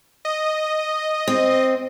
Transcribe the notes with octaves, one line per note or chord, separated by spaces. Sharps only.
D#5
C4